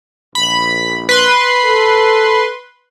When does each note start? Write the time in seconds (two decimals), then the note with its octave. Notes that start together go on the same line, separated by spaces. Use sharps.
0.35 A#1 B5
1.09 B4 C6
1.64 A4